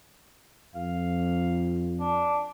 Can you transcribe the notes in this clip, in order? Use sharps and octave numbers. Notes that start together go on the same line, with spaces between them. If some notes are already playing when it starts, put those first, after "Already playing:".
F2 F5
D4